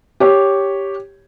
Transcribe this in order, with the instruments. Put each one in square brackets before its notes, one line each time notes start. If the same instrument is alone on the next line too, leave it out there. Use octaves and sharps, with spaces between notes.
[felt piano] G4 C#5